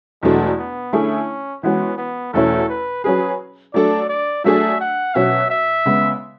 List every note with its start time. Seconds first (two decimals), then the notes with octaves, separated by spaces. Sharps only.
0.22 E2 B2 F#3 G#3 A3 D4
0.58 B3
0.93 D3 A3 C#4 E4 G#4
1.63 E3 G#3 B3 C#4 F#4
1.98 B3
2.33 E2 B2 A3 C#4 E4 A4
2.69 B4
3.04 F#3 C#4 G#4 B4
3.74 F#3 A3 D4 A4 D5
4.09 D5
4.44 F#3 A3 D4 G#4 E5
4.80 F#5
5.15 B2 F#3 C#4 F#4 E5
5.50 E5
5.85 C#3 G#3 B3